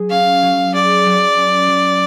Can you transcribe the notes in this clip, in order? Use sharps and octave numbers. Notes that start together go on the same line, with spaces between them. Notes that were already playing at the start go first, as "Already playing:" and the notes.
Already playing: F#3 G#4
C#4 F5
F#3
G#4 D5
F#3
C#4
F#3